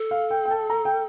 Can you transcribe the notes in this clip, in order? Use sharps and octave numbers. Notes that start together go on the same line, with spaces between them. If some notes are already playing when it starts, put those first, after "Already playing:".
Already playing: A4
F5
G5
G5
A5
A#5
G5